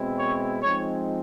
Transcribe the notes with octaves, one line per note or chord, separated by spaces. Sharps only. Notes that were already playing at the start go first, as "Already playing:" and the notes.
Already playing: B2 G#3 C4 E4
C#5
F3 G#3 C4 D#4 C#5